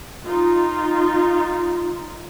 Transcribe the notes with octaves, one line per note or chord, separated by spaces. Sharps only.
D#4 F4